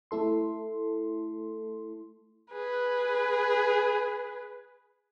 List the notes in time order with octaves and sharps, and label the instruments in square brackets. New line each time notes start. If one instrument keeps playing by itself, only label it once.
[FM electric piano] A3 E4 A4 C6
[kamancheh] G#4 B4